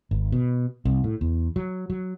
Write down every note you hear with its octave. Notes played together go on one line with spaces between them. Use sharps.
G#1
B2
C2
A2
E2
F#3
F#3